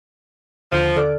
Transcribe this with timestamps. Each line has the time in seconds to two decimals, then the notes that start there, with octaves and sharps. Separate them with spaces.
0.72 D#2 D3 F3 D#7
0.96 D3 A4 D5 D6 F6